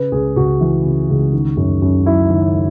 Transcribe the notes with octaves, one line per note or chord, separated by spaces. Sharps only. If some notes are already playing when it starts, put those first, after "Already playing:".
Already playing: C#3 B4
C#2 G#4
C#2 F#4
E3
C#3
C#2
D#3
F#2
F#2
F#3 E4
D#3